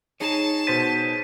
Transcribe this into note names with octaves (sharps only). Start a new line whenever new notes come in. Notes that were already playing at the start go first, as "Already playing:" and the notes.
D#4 G#4 C#5 A5
B2 C5 A6 B6 D#7